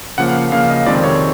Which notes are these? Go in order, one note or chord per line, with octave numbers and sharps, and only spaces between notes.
C#3 F3 A#3 F#5
F5
C#3 F3 A#3 F5
D#5
F2 C3 D#3 G#3 C4 D5
C#5